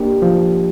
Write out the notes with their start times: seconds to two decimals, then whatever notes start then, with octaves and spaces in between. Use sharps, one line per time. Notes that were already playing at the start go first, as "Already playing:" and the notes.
Already playing: A#3 D4 G4
0.22 F3